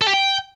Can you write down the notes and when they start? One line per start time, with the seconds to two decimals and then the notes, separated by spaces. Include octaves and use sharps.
0.02 A4
0.08 G4
0.14 G5